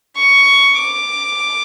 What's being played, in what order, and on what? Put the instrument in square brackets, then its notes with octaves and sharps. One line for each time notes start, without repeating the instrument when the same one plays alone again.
[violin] C#6
D6